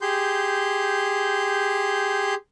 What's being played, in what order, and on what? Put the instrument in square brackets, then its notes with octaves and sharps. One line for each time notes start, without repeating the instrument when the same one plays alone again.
[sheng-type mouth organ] G4 G#4 C6 G6